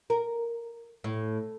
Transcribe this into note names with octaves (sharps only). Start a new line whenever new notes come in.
A#4
A2